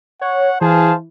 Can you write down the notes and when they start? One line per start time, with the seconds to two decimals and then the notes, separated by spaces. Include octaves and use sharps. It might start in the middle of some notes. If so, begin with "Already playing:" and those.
0.21 C#5 F#5
0.61 E3 G#4 C5 F5 A5